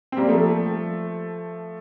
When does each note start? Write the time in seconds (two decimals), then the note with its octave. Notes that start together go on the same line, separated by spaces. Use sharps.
0.12 C4
0.17 G3 A#3
0.29 F3 A3